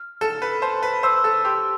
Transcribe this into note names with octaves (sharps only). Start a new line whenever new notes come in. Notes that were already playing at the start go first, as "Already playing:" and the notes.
Already playing: F6
A4 E7
B4
C5 A5
B4
C5 E6
A4
G4 C6